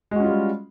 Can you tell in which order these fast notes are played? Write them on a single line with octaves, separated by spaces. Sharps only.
G#3 F#4 C#4 F4 G3